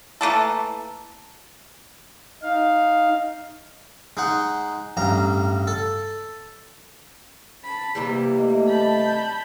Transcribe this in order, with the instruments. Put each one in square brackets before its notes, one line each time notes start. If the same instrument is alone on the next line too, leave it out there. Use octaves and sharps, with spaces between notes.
[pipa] E3 A3 A#3 A4
[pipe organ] D#4 F5
[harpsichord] G#3 D#4 F#5
A1 G2 A#5
A4
[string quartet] A5 B5
[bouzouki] C3 E3 G3 [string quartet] A#3
[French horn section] A3 D#5
[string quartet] A5 B5 G6